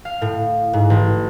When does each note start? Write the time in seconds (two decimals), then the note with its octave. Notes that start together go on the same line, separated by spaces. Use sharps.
0.05 F5
0.22 A2
0.73 G#2
0.90 A1